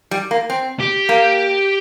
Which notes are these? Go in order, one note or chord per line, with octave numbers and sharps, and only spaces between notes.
G3
A#3
C4
G4
A#3